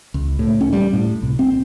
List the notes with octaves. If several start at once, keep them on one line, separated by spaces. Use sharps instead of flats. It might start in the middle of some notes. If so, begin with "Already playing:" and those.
C#2
A2
C#4
G3
A2
C2
C4